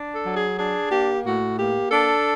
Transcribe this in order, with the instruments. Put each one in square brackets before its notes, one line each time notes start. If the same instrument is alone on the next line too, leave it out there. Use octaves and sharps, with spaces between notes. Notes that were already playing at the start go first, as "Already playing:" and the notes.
Already playing: [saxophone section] D4
A4
F#3
G#4
D4 G#4
A#3 G4
A2 F#4
A#3 G4
D4 A4